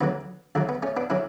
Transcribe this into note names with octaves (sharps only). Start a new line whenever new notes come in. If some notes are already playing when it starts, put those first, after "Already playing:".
D2 D3 F#3 B3
D2 D3 F#3 A3
B3
A3 C#4
B3 D4
D3 F#3 C#4 E4